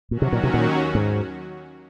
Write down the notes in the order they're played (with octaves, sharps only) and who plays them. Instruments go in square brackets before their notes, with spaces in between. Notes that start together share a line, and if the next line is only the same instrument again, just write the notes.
[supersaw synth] D#2 D#3 F#3 C#4 F#4 [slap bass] A#2
[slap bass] C3
A#2
C3
A#2
G#2